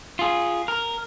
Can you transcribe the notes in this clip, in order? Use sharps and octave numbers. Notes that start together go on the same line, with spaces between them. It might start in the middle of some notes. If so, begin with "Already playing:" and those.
F4 G#4
A#4